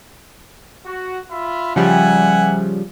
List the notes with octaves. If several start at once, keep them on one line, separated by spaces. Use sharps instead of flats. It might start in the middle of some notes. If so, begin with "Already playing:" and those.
F#4
F4 E5 B5
C#3 F3 G3 E5 F#5 G#5